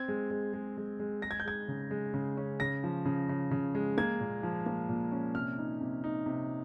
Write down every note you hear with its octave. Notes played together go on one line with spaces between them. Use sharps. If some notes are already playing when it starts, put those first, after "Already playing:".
Already playing: C4 G#6
G#3
G#3
G#3
G#3
G#3
G#3 A#6
G#6
G6
G#3 G#6
C#3
G#3
C#3
C#4
C#3 A#6
F3
C#3
C#3
C#3
G#3
A#3 G#6
A#2
F3
A#3
A#2
C#4
C3 F6
D#4
C3
D#4
C3